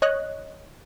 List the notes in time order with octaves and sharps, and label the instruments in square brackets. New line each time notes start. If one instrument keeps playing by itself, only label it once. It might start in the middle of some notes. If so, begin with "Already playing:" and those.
[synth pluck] C#5 D#5 F#6